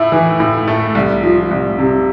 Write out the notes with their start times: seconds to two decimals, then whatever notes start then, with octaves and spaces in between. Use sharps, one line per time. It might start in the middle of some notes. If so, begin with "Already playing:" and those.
Already playing: A2 A3 E4
0.12 E3
0.40 A2
0.68 A3
0.95 C2
1.23 F3
1.51 C2
1.79 C3